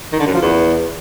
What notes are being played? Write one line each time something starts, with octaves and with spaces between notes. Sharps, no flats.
D#3
D3
F#2
F3
E2